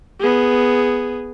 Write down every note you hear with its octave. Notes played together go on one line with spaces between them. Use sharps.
B3 G#4